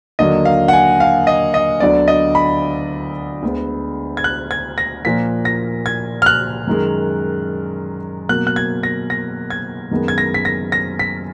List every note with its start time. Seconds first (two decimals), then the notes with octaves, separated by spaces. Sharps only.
0.19 D#2 D3 F#3 A#3 D#5
0.45 F5
0.68 F#5
0.73 G#5
1.00 F5
1.27 D#5
1.54 D#5
1.80 D2 D3 F#3 B3 D5
2.08 D#5
2.35 B5
3.43 D2 D3 G#3 B3
4.17 G#6
4.24 F#6
4.51 G#6
4.78 A#6
5.05 A#2 F3 A#3 B6
5.45 A#6
5.86 G#6
6.22 F6
6.26 F#6
6.67 F#2 D#3 G#3
8.29 B2 F#3 A#3 F#6
8.47 F#6
8.56 G#6
8.83 A#6
9.10 A#6
9.50 G#6
9.91 F#2 D#3 G#3 B3
10.08 G#6
10.18 A#6
10.34 B6
10.45 A#6
10.72 A#6
10.99 B6